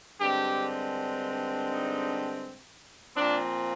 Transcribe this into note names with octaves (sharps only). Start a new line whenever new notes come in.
G2 D3 G#3 C4 G4
D#4
A#2 F3 C4 D4